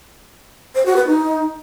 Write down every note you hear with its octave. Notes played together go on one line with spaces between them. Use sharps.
C5
F#4
B4
D#4